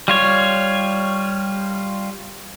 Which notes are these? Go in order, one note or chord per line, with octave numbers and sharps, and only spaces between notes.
G3 F4 C#5